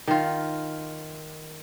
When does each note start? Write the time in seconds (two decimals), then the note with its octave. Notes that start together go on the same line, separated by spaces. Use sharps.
0.07 D#3 F4